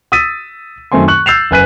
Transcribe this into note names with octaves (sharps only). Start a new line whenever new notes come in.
D#6 E6 A6 B6 D#7
F#2 D#3 A3 C4 G#5 C6
C#6 F#6 F#7
E6 G6 A6 C7 E7 F7
F#1 B4 G#5 F#6 B6 D#7